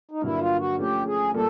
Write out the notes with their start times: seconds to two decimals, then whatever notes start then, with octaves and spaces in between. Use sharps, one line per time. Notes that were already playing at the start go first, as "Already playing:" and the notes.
0.11 D#4
0.22 G2 D3 F#3 A#3 E4
0.40 F4
0.59 F#4
0.79 F3 A3 C#4 G4
1.06 G#4
1.34 A#2 G3 A#3 A4